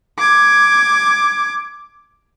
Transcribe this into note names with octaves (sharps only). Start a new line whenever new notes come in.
D6 G#6